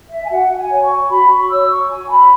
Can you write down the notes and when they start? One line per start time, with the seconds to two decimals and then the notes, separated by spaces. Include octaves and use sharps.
0.10 E5
0.25 G#5
0.30 F#4 F#5
0.57 G#5
0.70 C#5
0.83 C#6
1.10 F#4 B5
1.30 C#6
1.49 C#5 E6
1.70 C#6
1.89 F#4 G#5
2.10 B5